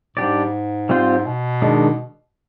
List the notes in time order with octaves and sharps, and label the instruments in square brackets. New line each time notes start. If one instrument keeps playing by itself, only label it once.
[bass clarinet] G#2 [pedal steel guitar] G3 D4 G4 D5
[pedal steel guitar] G3 C4 F4 C5
[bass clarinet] B2
[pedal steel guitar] D#3 G#3 D4